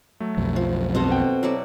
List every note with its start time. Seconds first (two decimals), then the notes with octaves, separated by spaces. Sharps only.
0.20 F#3 A3
0.37 B1 F2
0.56 F3
0.95 B2 C4 A4 D#5
1.11 F#5 G5
1.43 F#3 E4 D5